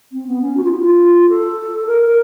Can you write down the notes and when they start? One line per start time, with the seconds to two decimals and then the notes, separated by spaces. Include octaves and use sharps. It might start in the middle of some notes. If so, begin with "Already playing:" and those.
0.12 C4
0.27 B3
0.42 C#4
0.57 F#4
0.63 F4
0.72 E4
0.79 F4
1.29 A4
1.87 A#4
2.06 A#4